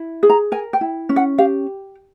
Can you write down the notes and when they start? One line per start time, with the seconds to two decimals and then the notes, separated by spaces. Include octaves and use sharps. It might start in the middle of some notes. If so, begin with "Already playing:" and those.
Already playing: E4
0.23 G#4
0.30 A#5
0.52 A#4 G#5
0.73 G5
0.81 E4
1.09 C#4
1.16 F#5
1.38 G4 F5